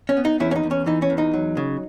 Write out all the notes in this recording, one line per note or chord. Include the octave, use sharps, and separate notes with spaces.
C#4
B3
D#4
E2 C#4 E4
C#4
D#4
E2
C#4
E3 D#4
C#4
E2
D#4
F#3
C#3